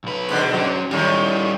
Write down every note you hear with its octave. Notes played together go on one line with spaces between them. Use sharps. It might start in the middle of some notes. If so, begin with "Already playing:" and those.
B1 B4
G#2 B2 D3
F#3 C#4
A2 D#3 G3 C#4